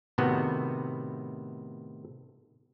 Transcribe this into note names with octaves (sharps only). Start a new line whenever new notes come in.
A2 C3 D#3 A3 B3 F#4